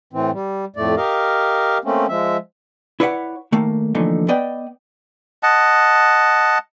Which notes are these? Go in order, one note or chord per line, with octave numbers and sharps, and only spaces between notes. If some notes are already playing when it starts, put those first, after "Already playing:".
A2 E3 C4
G3
F2 A2 A3 D5
G4 A#4 D#5 F5
A3 A#3 C4 C#4
F3 G#3 E5
E4 B4 C#5 D5 E5 F#5
D#3 A3 A#3
D3 E3 F3 A3 A#3 D#4
B3 B4 D5 D#5 G5
D#5 F#5 A5